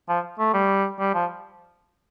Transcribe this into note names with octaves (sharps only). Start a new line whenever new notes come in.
F3
A3
G3
G3
F3